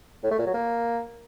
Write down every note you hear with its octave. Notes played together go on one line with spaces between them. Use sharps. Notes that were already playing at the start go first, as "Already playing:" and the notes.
A2
A3
A#2
F#3
A#3